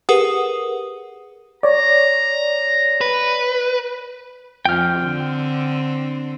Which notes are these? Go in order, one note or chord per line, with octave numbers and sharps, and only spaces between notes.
G4 G#4 A#4 B4 F#5 D#6
C#5 D5 A#5
B4
F2 G5 F6
D3 C4